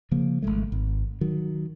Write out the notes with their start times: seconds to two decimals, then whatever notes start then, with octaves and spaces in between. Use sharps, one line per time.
0.11 C#3 F3 A#3
0.42 G#1 G2 G#3 A3
0.72 G#1
1.21 D#3 F#3